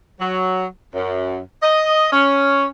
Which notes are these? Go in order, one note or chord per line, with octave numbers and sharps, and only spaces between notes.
F#3
F#2
D#5
C#4